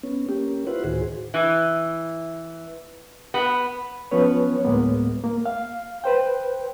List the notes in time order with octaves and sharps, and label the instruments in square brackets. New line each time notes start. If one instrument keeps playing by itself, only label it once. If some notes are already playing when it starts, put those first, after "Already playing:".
[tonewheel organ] B3 C#4
A#3 C#4 G4
E4 F4 B4 C5 F#5
D2 A2 D#3 F#4 G#4 C5
[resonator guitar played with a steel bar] E3
B3
[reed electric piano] F3 B3 C#4 B4 C#5
D2 A2 G#3 A#3 B3
A#3
F5
B4 C5 G5